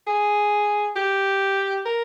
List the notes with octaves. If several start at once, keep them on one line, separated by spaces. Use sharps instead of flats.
G#4
G4
A#4